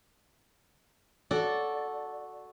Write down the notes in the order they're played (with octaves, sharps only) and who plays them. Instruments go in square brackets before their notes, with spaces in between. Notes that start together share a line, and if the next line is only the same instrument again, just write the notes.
[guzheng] F#4 A4 D5